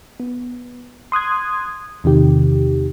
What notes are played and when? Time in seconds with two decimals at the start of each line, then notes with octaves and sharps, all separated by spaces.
0.20 B3
1.12 C6 D#6 F#6 G#6
2.04 E2 C3 D#3 G4